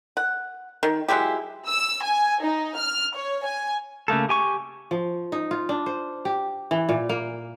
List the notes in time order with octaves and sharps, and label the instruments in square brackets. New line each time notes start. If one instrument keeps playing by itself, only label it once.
[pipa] F#5
D#3
F#3 G#3 E4 G4
[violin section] E6
G#5
D#4
F6
C#5
G#5
[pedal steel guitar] C#3 A3 A#3 A4
G4 G#5 C#6
[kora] F3
D#4
F4
D4
C5
G4
E3
A#2
A#3